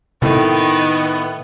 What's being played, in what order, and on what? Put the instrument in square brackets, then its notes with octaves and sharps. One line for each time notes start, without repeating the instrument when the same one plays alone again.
[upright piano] A2 [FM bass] C3 [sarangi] D#3 [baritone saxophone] B3